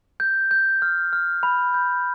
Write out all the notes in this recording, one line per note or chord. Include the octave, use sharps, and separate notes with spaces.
G6
G6
F6
F6
B5
G6